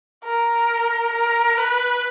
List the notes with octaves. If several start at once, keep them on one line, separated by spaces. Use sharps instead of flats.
A#4
A#4
B4